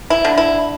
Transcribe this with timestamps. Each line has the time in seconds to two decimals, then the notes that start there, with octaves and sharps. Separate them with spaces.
0.10 E4
0.25 D3
0.38 E4